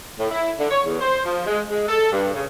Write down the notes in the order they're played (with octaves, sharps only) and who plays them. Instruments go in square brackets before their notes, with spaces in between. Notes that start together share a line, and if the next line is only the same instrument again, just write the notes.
[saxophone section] A2
E4
D3
C#5
E2
C5
F3
G#3
G#3
A4
G2
C#3